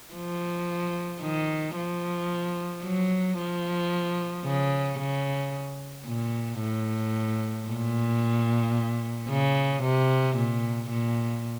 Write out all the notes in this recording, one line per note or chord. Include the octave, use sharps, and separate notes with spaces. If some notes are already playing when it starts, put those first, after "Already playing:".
F3
D#3
F3
F#3
F3
C#3
C#3
A#2
A2
A#2
C#3
C3
A#2
A#2